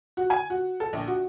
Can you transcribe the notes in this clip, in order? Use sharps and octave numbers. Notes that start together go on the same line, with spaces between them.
F#4
G#5
F#4
A4
A#1
F#4